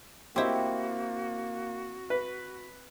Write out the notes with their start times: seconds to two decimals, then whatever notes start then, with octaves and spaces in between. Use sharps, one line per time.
0.36 A#3 C4 E4 F#4 G4 C5 D#5
2.10 B4